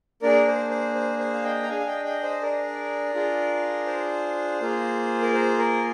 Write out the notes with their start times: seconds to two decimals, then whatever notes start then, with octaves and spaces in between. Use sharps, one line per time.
0.22 A#3 D4 G#4 A#4 D5
0.47 C5
0.70 C5
0.95 C5
1.19 C5
1.34 F5
1.44 D#5 G5
1.63 A#5
1.68 D4 G#4 F5 G#5
1.80 F5
1.86 D#5 G5
2.05 D#5 G5
2.23 C5 D#5
2.42 A#4 D5
3.14 D4 F4 G#4
3.87 C5
4.61 A#3 F4 G#4
5.22 A#4
5.34 C5
5.58 A#4